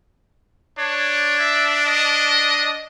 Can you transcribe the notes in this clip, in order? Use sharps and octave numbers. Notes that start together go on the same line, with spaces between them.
D4 C#5
E5
D#5